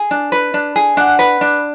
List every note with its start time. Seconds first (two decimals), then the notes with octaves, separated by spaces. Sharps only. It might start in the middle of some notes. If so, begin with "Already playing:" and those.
Already playing: G#4
0.11 D4
0.32 B4
0.54 D4
0.76 G#4
0.97 D4 F#5
1.19 B4
1.41 D4